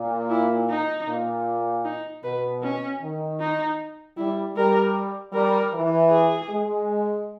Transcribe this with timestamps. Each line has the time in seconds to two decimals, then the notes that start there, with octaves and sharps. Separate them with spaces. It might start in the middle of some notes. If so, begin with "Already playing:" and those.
Already playing: A#2
0.30 E4
0.69 D#4
1.07 A#2
1.85 D#4
2.24 B2 B4
2.62 C#4
3.01 D#3
3.39 D#4
4.17 G3 E4
4.56 G3 A#4
5.33 G3 A#4
5.73 E3
6.10 G#4
6.49 G#3